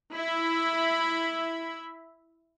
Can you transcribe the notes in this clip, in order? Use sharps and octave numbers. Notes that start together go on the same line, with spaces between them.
E4 E5 B5